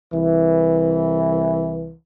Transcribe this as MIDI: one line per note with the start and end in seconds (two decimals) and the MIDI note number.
0.14 1.93 36
0.14 1.93 52